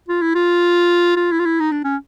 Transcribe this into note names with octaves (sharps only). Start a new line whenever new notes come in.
F4
E4
F4
F4
E4
F4
E4
D#4
D4
C#4